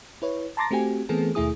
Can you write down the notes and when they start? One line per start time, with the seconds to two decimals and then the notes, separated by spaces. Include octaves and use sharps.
0.22 E4 B4 C#5
0.57 A5 A#5 C6 D6 A6 A#6
0.71 A3 C4 F#4 G4 G#5
1.09 E3 A3 B3 C4 G#4 A4
1.35 D#2 B2 A3 E4 G#4 D#6